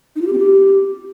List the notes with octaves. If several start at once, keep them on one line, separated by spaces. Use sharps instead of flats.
D#4
F4
G4
C4
G4